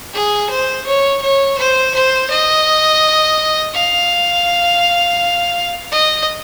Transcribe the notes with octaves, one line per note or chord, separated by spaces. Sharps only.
G#4
C5
C#5
C#5
C5
C5
D#5
F5
D#5